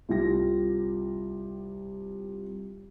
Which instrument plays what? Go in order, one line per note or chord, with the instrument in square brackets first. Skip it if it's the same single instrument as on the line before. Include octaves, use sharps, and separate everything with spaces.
[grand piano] C2 F4 G4 A#6